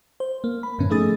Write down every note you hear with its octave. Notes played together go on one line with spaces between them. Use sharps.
C5
A#3
B5
F#2 A2 D3 B3 C#4
F3 A3 D#4 G#4 D#6 A6